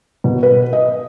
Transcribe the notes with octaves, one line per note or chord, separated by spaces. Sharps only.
B2
B4
D#5